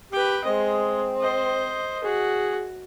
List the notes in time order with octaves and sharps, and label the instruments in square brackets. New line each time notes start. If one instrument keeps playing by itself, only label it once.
[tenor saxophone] G4 [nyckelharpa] B4 G5
[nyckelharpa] G#3 D#5 [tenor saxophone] C4
[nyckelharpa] C5 D#5
[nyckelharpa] F#4 [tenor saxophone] G#4